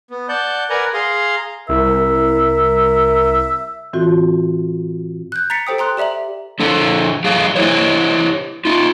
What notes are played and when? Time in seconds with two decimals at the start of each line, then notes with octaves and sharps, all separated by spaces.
0.10 B3
0.29 D5 F#5 A5 G6
0.70 A#4 B4 D5 F#5 G#5 A#5
0.94 G#4 F5 A#5 C6
1.69 C2 A#4 E5
3.93 A2 E3 C4 F4 F#4
5.32 F#6 G6
5.50 A#5 A6 B6 C#7
5.67 G4 A4 C5 G5 D#6
5.78 G5 A#5 C6 F#6
5.97 G4 D5 E5 A#5 F#7
6.60 D3 F3 A4
7.24 F#3 G4 G#4 F5
7.56 E4 G4 C5 C#5
8.65 D#4 F4